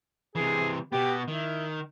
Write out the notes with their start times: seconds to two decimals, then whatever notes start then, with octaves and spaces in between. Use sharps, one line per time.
0.36 C3 E3 G#4
0.92 B2 B3 G4
1.28 D#3 E4